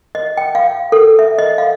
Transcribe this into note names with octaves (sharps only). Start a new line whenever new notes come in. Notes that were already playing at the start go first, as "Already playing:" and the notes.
D#5
G5
F5
A4
E5
D#5
F5